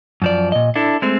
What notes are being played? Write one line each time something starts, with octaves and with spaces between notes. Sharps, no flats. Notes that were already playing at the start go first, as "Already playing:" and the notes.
F#2 F3 D5
A#2 D#5
D4 E4 A4
G#3 A3 C4